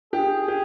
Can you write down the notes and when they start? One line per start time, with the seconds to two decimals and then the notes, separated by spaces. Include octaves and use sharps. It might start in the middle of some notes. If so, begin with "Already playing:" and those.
0.13 G4 G#4
0.48 G4